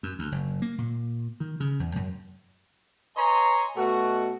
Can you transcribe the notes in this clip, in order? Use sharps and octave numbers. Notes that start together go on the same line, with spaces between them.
F#2
D2
F#1
A#3
A#2
D#3
C#3
E2
F#2
B4 C#5 D#5 G#5 A#5 C6
B2 A3 F#4